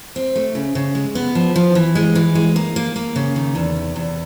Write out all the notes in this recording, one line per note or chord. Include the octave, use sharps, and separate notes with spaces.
C4
A3
C#3
C#3
G#3
B3
F3
F3
E3
G#3
E3
G#3
A#3
A#3
A#3
C#3
D#3
E2
C3
E2